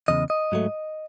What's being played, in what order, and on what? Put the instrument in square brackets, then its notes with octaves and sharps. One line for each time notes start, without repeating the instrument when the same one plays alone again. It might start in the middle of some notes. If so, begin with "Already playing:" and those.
[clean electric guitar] E2 C#3 D#5
D#5
G#2 F#3 A3